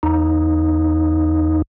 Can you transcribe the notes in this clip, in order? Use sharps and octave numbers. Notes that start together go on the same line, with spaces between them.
E2 D#4